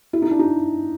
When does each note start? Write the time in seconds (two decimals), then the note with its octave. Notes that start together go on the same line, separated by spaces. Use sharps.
0.13 E4
0.22 D#4
0.31 D4
0.39 D#4